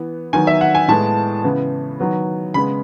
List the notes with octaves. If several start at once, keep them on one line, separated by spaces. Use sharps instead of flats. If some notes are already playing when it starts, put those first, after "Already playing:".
Already playing: E3 B3
D#3 F#3 B3 G#5
E5
F#5
G#5
A2 G#3 B3 A5
C#3 E3 B3
D#3 F#3 B3
C#3 G#3 B3 B5